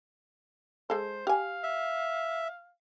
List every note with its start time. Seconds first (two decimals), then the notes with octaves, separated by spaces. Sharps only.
0.90 G#3 A4 C5
1.27 G4 F5 G#5
1.63 E5